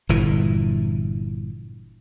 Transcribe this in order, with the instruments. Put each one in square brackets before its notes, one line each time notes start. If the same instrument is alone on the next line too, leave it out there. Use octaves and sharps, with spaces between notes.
[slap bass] G1 A#2 E3